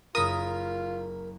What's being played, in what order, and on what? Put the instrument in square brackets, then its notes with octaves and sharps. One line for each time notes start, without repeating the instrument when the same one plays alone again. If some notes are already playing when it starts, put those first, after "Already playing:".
[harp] F#1 A#6 [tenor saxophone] F4 [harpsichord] A#4 B5 [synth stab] D#6